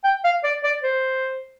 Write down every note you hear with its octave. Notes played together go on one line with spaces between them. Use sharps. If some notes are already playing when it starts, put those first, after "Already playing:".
G5
F5
D5
D5
C5